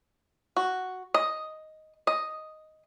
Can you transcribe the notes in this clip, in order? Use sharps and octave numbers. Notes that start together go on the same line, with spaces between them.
F#4
D#5
D#5